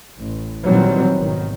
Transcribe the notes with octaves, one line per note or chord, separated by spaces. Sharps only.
A1
A#2 D#3 E3 F#3 G3 C4
G#1 B2 D#3